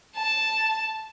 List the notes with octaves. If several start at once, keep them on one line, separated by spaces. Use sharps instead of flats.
A5